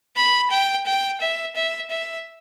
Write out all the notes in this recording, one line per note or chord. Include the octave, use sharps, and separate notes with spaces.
B5
G5
G5
E5
E5
E5